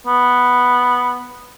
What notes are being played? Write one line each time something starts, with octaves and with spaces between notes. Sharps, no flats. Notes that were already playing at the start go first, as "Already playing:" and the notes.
B3